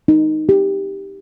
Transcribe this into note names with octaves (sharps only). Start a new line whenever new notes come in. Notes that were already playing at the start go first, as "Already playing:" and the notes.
D#4
G4